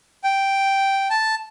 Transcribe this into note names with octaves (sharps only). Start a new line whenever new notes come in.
G5
A5